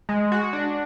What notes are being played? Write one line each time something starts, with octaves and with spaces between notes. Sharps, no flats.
G#3
F#4
D4